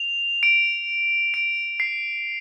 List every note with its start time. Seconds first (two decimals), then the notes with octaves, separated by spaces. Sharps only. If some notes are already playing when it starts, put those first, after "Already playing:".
Already playing: F7
0.43 D7
1.34 D7
1.80 C7